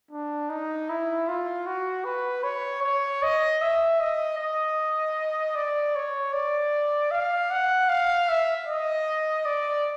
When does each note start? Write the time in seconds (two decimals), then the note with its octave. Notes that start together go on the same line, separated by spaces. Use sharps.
0.11 D4
0.50 D#4
0.89 E4
1.28 F4
1.66 F#4
2.05 B4
2.44 C#5
2.83 C#5
3.23 D#5
3.61 E5
4.00 D#5
4.39 D#5
5.55 D5
5.96 C#5
6.33 D5
7.11 F5
7.51 F#5
7.89 F5
8.29 E5
8.67 D#5
9.46 D5